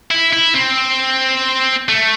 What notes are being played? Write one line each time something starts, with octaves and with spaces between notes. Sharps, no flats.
E4
E4
C4
A3